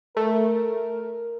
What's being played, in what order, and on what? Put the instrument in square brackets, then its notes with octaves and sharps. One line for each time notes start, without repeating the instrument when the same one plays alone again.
[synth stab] A3 [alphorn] A#4